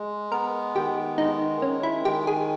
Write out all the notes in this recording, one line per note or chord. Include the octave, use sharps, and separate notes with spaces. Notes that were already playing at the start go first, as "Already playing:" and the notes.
Already playing: G#3
B3 A#4
D#3 G4
G#3 D#4
D#3 C#4
E4
D#3 G4
G#4